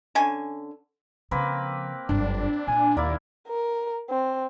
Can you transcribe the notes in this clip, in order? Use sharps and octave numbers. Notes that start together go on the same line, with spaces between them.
D3 C#4 G#5
C#3 F3 A#3 C4 B4
G1 F#2 D4
A#2 G#5
D#2 A#3 E4 D5
A#4
C4